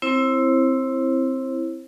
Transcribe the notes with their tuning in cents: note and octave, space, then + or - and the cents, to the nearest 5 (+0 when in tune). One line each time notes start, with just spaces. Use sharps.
C4 +0 E4 +0 C5 +35